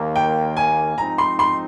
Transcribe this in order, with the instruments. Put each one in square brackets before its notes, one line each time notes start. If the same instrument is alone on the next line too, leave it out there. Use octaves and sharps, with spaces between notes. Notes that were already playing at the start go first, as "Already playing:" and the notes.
Already playing: [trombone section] D#2 D#3 A#3
[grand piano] G5
G#5
[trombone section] G#2 F3 C4 D#4 [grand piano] A#5
[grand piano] C6
C6